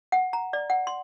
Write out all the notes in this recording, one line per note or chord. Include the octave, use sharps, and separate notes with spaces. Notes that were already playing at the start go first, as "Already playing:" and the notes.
F#5
A#5
D5
F#5
C6